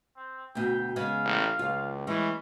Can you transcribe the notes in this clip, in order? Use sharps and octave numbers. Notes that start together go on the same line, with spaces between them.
C4
D2 B2 G5
C#3 G#3 B3 F5
A1
C#2 F4
E3 G3 G#3 C#4